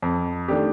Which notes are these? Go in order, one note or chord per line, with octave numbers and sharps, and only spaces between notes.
F2
D#3 A3 D4 G4